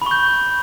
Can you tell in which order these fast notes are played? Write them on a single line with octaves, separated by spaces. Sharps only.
B5 C#6 G6